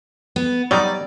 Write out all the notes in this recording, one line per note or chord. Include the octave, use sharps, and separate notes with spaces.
B3
F#3 G3 D#4 D5